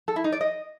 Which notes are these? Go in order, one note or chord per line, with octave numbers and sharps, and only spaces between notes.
A4
E4
D#4
D5
D#5